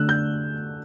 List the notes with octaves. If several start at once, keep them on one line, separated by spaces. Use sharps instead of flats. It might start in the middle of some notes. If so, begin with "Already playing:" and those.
Already playing: D3 A3 D4 E6 F#6
G6